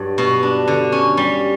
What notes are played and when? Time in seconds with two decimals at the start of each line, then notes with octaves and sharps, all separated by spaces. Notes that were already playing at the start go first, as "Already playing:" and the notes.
Already playing: G2 F#3
0.18 B2
0.43 D4
0.68 D3
0.92 C#4
1.17 G3